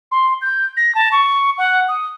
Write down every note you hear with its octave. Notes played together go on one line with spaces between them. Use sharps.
C6
G6
A#6
A5
C#6
F#5
D#6